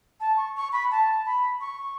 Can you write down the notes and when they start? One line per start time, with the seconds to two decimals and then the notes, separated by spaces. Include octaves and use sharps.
0.20 A5
0.37 C#6
0.56 C#6
0.72 B5
0.91 A5
1.26 B5
1.61 C#6